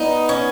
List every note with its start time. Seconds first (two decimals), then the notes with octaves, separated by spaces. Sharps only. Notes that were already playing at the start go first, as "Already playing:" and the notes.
Already playing: B3 D#4
0.29 C#4